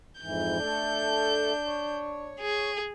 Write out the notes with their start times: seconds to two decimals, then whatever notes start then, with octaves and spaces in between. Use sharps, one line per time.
0.21 F2 G#2 E3 G6
0.60 A3 D4 A4
1.65 C#5
2.40 G#4